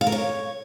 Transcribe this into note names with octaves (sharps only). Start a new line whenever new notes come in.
F5
A#4
C#5